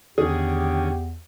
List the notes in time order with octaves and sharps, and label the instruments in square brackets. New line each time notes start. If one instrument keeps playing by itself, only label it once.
[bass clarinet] E2 [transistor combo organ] D3 D#3 C#4 [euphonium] G4 [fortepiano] G#4